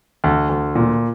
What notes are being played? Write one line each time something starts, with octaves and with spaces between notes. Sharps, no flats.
D2
D2
A#2